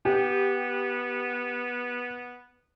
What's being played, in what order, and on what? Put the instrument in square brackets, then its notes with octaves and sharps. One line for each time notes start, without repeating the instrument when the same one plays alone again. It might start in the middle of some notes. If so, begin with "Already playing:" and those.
[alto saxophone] B3 [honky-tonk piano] G4